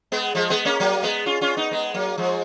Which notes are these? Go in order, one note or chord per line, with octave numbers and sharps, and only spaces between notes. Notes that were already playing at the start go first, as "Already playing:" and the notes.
G#3 B3
F3 G#3
G#3 B3
A#3 C#4
F#3 A#3
G#3 B3
C#4 F4
C#4 F4
B3 D#4
G#3 B3
F#3 A#3
F3 G#3